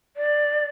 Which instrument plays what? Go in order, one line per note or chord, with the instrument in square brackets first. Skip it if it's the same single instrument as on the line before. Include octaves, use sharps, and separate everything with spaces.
[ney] D5